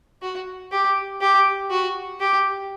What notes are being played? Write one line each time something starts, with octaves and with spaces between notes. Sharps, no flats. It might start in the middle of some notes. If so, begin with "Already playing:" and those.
F#4
G4
G4
F#4
G4